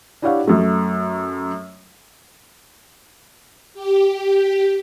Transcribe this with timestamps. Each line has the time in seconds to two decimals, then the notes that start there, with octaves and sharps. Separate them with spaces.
0.22 D4 E4 G4 C#5 F5 F#5
0.47 F#2 A3
3.74 G4